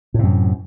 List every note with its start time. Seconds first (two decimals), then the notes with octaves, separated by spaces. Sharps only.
0.14 A2
0.19 C3
0.23 F#2